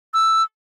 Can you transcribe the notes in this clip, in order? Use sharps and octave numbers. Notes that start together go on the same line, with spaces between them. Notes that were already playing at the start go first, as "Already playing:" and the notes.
E6